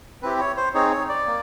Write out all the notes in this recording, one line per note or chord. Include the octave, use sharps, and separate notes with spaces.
C4 E4 G4 B4
C#5
C5
C4 D#4 G#4 C#5
C#5
D5
A#3